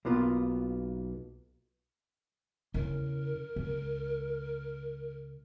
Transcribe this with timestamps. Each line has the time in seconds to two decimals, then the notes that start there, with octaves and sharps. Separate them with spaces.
0.05 B1 A#3 B3 F4
2.74 E2 C#3 A#4
3.56 C#2